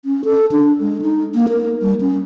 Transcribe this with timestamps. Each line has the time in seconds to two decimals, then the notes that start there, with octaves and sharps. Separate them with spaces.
0.05 C#4
0.25 A4
0.52 D4
0.81 G#3
1.02 D#4
1.35 A#3
1.49 A#4
1.82 G3
2.01 C#4